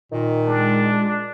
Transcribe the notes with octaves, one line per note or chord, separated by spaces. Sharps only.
A#2 D#3
G#3 D4